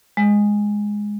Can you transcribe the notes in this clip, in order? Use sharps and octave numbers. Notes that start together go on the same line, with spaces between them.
G#3